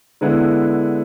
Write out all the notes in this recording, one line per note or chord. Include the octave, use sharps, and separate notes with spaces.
D3 G#3 B3 E4